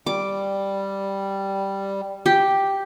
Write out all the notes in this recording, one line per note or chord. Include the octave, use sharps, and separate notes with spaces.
G3 D6
G4